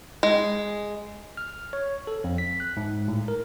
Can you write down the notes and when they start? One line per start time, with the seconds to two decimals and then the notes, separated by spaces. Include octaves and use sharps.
0.23 G#3
1.37 F6
1.73 C#5
2.07 A4
2.24 F2
2.38 B6
2.60 F#6
2.77 G#2
3.08 A2
3.28 A#4